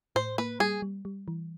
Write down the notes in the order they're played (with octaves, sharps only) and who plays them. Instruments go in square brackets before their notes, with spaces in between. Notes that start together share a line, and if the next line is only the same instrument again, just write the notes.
[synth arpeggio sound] A2 [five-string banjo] C5
[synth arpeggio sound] A#3 [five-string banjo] B4
[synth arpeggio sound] G3 [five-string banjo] G#4
[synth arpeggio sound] G3
G3
E3